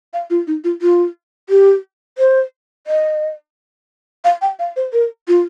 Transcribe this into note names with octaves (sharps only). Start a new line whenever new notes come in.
F5
F4
D#4
F4
F4
G4
C5
D#5
F5
G5
F5
C5
A#4
F4